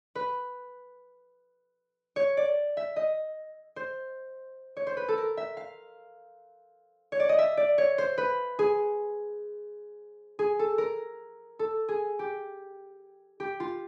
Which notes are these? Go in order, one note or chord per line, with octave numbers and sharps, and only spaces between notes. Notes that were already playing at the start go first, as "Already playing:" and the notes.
B4
C#5
D5
E5
D#5
C5
C#5
C5
B4
A4
A#4
E5
F5
C#5
D5
D#5
E5
D5
C#5
C5
B4
G#4
G#4
A4
A#4
A4
G#4
G4
G4
F4